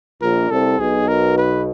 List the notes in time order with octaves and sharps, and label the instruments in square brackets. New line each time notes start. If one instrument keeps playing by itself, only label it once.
[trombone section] A#1 A#2 [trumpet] A#4
[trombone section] C2 C3 [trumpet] A4
[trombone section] B1 B2 [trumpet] G#4
[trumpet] A#4
B4